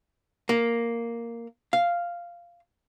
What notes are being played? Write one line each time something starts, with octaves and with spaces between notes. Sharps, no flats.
A#3
F5